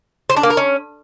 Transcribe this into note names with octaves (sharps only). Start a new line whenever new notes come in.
C5
D4
A#3
A#4
C#4